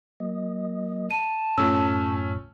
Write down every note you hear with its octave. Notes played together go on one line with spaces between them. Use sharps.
F#3 A#3 D#5
A5 D#7
F#2 A2 A3 C#4 F4 E6